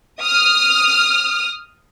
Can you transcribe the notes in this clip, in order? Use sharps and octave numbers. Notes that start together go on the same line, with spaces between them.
D#6 F6